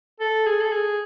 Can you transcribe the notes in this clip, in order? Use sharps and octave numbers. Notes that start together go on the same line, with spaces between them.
A4
G#4
A4
G#4